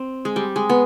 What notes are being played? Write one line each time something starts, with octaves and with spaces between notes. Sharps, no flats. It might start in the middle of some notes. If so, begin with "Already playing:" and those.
Already playing: C4
G#3
G3
G#3
B3